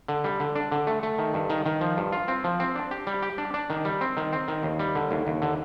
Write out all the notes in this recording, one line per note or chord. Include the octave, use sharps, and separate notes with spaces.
D3
G3
D3
D4
D3
A3
A3
D#3
G2
D#3
D#3
F3
G2
F4
C4
F3
C4
D4
G4
G3
G4
D4
D4
D#3
G3
C4
D#3
C4
D#3
D#2
G3
D3
D#2
D#2
D3